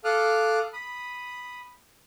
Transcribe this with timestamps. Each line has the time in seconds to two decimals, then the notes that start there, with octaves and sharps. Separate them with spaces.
0.04 A4 F5 D6 D#6 F6 F#6
0.73 B5 D#6